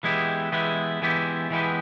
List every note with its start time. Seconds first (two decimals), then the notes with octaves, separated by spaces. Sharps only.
0.03 E3 G#3 B3 E4 G4
0.52 E3 G#3 B3 E4 G4
1.02 E3 G#3 B3 E4 G4
1.51 E3 G#3 B3 E4 G4